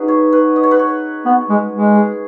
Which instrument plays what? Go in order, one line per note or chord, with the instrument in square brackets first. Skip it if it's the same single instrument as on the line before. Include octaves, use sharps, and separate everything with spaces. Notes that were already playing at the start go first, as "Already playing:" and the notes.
Already playing: [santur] C#4 D#4 F#4 G#4 B4
C#5
B4
D#5
C#5
B4
C#5
[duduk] B3
G#3
G#3
[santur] G#4